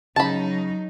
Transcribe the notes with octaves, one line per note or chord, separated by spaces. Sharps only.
C#3 F#3 D#4 A5 B5